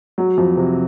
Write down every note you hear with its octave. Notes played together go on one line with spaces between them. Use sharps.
F#3
F2
C3